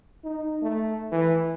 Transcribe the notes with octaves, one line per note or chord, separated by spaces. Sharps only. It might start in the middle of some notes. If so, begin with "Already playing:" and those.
D#4
A3
E3